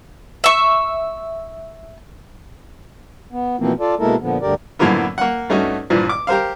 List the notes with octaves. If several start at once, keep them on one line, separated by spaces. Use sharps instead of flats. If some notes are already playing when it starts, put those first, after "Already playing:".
E5 C#6
B3
B2 E3 F3 A#3 C4
F4 A4 D5
B2 G#3 A#3 E4 A4 A#4
A#2 D3 F3 B3
D2 G2 D3 G4 A#4 D5
F#2 A2 D3 F3 A#3 B3
A#3 F#5
G2 A3 C#4 D#4 F#4
G2 A#2 E3 F3
D6
G4 A#4 C5 F5